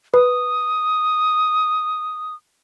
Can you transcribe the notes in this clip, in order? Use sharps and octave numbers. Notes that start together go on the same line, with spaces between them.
B4 D#6